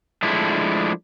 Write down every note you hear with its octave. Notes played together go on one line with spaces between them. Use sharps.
F3 G#3 A3 D4 E4